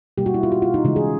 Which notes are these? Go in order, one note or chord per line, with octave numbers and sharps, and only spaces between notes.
B2 G3 A#3 G4
F#4
E4
F4
F#4
F4
D#4
C#3 E3 G#3 D#4
G#4